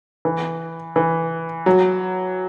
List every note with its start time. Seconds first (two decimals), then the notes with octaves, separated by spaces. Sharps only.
0.25 E3
0.96 E3
1.66 F#3